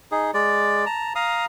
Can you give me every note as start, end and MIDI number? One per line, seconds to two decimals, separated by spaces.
0.11 0.31 63
0.11 0.31 68
0.34 0.85 56
0.34 0.85 74
0.86 1.13 81
0.86 1.13 82
1.15 1.46 77
1.15 1.46 82
1.15 1.46 87